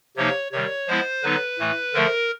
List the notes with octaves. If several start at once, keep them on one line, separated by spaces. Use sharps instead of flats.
C3 F3 A#3 D#4 C#5
C3 D#3 G3 C#5
F3 G#3 B3 E4 C5
D3 F#3 B3 D#4 B4
A2 E3 A3
D3 F3 A3 A#4